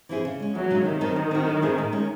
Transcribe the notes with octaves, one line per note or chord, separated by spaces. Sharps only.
E3 C4 E4 G#4
C#3
G#3 C#4
E2 F#3
C#3 G#3 D#4
C3 D#3
F#3 C4 D#4 A4
F#3
C4 F#4
F#3
C4 E4 G#4
A2
G#3 C#4